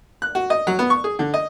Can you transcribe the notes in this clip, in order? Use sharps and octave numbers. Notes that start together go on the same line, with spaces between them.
F#6
F#4
D#5
F#3
B3
C#6
G#4
D3
D#5